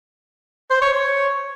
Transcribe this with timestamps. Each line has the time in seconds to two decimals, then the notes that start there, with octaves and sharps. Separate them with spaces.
0.70 C5
0.82 C#5
0.93 C#5